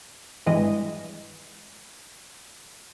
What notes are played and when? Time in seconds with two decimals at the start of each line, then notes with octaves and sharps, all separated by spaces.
0.46 G#1 G2 E3 G#3 D#5